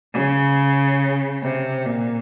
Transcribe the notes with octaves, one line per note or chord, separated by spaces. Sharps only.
C#3
C3
A#2